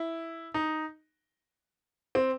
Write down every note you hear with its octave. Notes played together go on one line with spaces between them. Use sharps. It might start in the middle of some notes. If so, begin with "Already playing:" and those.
Already playing: E4
D#4
C4